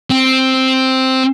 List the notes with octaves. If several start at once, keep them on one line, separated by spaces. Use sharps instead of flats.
C4